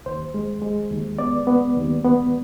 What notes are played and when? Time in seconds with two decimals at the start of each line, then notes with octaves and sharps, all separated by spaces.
0.06 D#2 C5
0.34 G#3
0.62 G#3
0.91 D#2
1.19 B3 D5
1.47 B3
1.76 D#2
2.04 B3